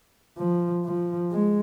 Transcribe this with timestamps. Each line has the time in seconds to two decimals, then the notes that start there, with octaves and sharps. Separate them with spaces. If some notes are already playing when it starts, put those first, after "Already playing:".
0.37 F3
0.85 F3
1.32 G#3